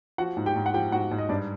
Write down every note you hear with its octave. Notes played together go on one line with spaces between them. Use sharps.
F3 F#4 F#5
G#2
G4 G5
G#2
F#5
F3 G4 G5
G#2 F#4 F#5
G#2
D#5
G2 D4 D5